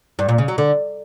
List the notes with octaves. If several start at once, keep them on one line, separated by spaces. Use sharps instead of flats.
G2
A#2
C#3
F#3
D3